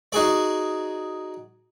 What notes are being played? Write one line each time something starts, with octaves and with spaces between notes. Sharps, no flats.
D#4 F#4 G#4 D5